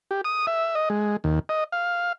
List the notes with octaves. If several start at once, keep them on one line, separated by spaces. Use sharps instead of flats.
G4
D#6
E5
D#5
G#3
D#2
D#5
F5